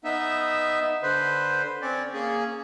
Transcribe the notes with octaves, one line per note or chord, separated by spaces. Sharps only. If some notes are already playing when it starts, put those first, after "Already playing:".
B3 D#4 E5
D3 B4 C5
C4 C#4 D5
A#3 C#4 G#4